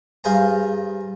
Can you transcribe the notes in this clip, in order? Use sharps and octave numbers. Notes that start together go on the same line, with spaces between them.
G2 F4 G#4 C5 G#5 A#5